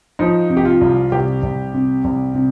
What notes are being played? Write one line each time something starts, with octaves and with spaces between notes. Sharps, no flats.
F3 D#4
C3
G4
F4
C2
C2 G4
C2
C3
C2
C3